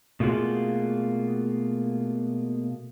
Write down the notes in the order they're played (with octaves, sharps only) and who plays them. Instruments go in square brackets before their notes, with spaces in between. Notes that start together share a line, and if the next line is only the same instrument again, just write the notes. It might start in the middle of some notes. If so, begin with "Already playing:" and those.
[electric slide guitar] B2 A3 A#3 F4 F#4 G#4